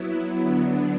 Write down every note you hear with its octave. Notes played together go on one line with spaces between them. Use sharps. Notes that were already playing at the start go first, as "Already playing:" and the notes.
Already playing: F#3 B3 E4
D3 F#3 B3 D4